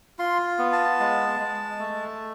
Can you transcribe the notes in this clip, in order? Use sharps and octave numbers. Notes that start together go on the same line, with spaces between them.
F4 C6
B3
A5
G#3
G#3
A3